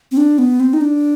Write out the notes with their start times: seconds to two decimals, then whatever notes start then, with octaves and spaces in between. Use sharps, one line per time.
0.11 C4
0.17 D4
0.38 B3
0.60 C4
0.73 D#4
0.81 D4